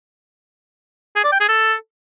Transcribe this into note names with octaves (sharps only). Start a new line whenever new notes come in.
G#4
D5
G5
G#4
A4